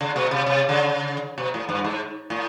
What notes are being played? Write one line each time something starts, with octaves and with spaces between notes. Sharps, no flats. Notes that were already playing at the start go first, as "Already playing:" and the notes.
C#3
B2
C3
C3
C#3
B2
A2
G2
G#2
A2